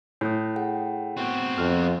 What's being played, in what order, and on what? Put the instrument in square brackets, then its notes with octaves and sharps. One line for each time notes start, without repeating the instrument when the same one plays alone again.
[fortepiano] A2 [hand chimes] D#6 F#6 G6
[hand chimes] G#4 F#5 G5
[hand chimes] A3 B3 F#5 [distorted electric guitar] C4 F#4
[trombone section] F2 [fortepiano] F6